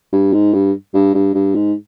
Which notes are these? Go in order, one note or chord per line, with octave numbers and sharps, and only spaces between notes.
G2
G#2
G2
G2
G2
G2
G#2